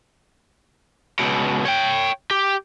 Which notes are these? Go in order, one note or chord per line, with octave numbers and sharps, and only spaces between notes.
C#2 B2
C#5 G5
G4